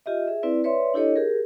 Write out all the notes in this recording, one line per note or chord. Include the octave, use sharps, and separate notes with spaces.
F4 G4 D#5 E5
G#4 E5
C4 E4 B4 D5
B4 C#5 D5 E5 C6
D4 E4 G4 A4 C#5 D#5
G4 G#4 A#4